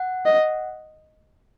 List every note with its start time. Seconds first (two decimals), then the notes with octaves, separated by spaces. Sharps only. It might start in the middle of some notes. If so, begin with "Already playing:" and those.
Already playing: F#5
0.26 D#5